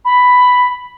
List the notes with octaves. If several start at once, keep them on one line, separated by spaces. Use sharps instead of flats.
B5